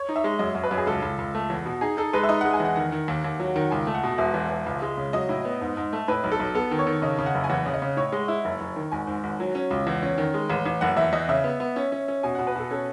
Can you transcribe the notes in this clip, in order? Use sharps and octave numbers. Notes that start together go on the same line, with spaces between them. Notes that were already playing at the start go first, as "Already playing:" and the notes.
Already playing: C#5
D#4
E5
G#3
F#2 D#5
F#2
B4
F#2
G#4
C#2 A4
C#2
C#2
A3
E2
B2
D#4 G#4
D#4 A4
G#3 B4
E5
D#4 D#5
F#5
G#3
G#5
E2 F#5
D#3 F#5
D#3
D#2
D#2
F#3
D#3
F#5
C#2 G#5
A3
F#5
B2
E1 E5
E2
E1
C#2
G#3
C#3
F#3 D#5
A2
B3
G#2
G#2
A3
A2 B4
B1
A4
B1
B3 A4
D#3
C#5
D#3
C#3 D#5
C#3
F#5
F#1
G#5
E2 F#5
C#3
D#5
C#3
A2 C#5
G#3
E4
F#1
F#1
D#3
G#1 G#5
G#2
G#1
F#3
C#4
C#2
E2
C#4
D#3
G#3
A1
A1
F#1 F#5
E2 E5
E2 D#5
C#3 E5
B3
B3
C#4
C#4
C#4
B2 G#5
F#5
B2
B4
B2 A4
C#4 A4